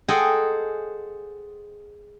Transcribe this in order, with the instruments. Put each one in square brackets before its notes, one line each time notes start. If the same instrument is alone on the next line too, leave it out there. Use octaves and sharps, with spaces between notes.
[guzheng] G#4 A4 C5 D#5 F#5 G5